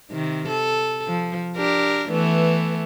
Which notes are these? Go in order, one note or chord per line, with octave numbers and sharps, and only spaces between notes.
C3 D#3
A4
F3
D4 G4 A#4
E3 A3 B3